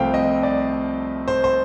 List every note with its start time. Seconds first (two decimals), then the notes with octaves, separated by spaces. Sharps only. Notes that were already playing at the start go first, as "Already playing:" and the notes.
Already playing: C2 C3 F3 A3 C4 F5 G5
0.14 D#5
0.43 D5
1.28 C5
1.44 C5